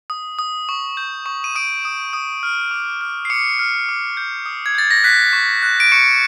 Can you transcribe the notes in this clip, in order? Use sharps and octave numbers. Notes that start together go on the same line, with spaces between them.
D#6
D#6
C#6
G6
C#6
D#7
D#6 D7
D#6
D#6
F6
D6
F6
C7
D6 C#7
F6
D6
G6
D#6
G#6
G6 A6
A#6
F#6 B6
C#6
F#6
D7
C#6 C#7